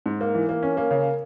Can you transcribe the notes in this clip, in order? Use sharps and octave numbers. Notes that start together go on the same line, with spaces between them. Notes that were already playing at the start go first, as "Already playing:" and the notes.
G#2
A#3
E3
A#3
C#4
A#3
C#3